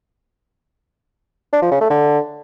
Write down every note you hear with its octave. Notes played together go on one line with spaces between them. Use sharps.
D4
F3
C#3
A3
D3